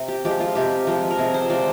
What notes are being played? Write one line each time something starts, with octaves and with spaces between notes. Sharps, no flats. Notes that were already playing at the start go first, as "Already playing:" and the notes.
Already playing: C3
G4
F3 G#3 G4
F4
C3 G4
F3 G#3
A#4
C3 G#4
C5
F3 G#3 D5